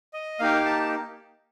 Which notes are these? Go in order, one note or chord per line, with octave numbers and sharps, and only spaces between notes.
D#5
A#3 D#4 G4 F5
A5